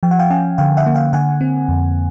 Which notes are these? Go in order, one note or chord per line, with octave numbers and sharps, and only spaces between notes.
F3 G5
F#5
F5 G5
C#4 F#5 G#5
D3 F5 G5
E5 F#5
A#3
F5 G5
D3 F#5 G#5
C4
F2